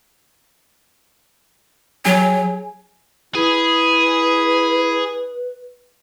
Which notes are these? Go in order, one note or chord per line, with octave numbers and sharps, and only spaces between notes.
F#3 G#4
E4 G#4 B4